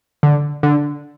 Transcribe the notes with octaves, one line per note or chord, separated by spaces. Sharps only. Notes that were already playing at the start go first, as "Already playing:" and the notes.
D3
D3